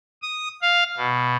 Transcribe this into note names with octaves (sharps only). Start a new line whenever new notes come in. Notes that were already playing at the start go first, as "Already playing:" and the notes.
D#6
F5
B2